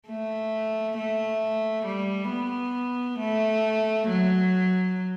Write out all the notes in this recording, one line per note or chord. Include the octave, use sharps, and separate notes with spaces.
A3
A3
G3
B3
A3
F#3